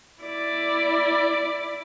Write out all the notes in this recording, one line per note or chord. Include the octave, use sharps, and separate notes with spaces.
E4 D5